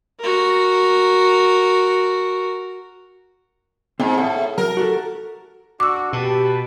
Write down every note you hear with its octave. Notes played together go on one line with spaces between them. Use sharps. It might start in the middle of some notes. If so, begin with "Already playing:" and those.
F#4 A#4
G#2 C4 F4
A2 C5 F#5
F#3 A#4
F#4 G4 A4
D4 F#4 D6 E6
B2 G4 B4 A5